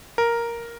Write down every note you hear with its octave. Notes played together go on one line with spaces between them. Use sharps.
A#4